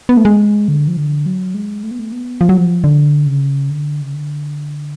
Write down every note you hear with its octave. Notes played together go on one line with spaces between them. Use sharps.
B3
A3
G#3
D3
F3
D3
F#3
G#3
A3
B3
A3
B3
F3
F#3
F3
D3
C#3
D3
C#3
D3